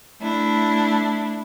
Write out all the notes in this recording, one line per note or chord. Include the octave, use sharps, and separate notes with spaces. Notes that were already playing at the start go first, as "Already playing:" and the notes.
A3 D4 E4